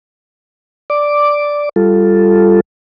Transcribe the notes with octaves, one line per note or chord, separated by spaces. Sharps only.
D5 D6
G3 F4 A4